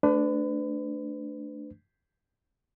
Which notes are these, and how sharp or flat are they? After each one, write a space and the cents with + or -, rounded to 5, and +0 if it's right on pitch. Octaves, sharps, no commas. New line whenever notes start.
A3 +0 D4 +0 B4 +35